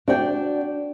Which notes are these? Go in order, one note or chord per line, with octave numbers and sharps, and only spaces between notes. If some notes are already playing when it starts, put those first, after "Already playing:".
D4 F#4 D5 G5